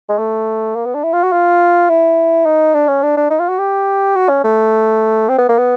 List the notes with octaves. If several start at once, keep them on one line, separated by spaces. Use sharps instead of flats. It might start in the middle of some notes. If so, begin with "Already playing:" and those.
G#3
A3
A#3
B3
D4
E4
F4
F#4
F4
E4
D#4
D4
C#4
D4
D4
D#4
F4
F#4
G4
F#4
C#4
A3
C4
B3
A#3
B3